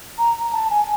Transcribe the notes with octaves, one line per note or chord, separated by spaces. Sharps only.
A#5
A5
G#5